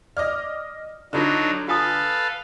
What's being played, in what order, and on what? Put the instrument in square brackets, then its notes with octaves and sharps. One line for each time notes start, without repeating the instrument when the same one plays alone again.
[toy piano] D5 [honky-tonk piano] D#5 D6 F6
[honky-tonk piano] D3 [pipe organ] F#3 D4 D#4 [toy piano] F4 B4
[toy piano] F4 G#5 D#6 [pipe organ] A4 B4 F5